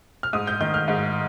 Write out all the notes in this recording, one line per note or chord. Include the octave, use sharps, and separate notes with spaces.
F6
G#2 D#6
G6
D#3 G6
F6
G#2